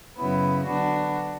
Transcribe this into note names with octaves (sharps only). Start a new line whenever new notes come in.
F#2 C#3 F#3 B3 E4
D3 F#3 B3 D4 F#4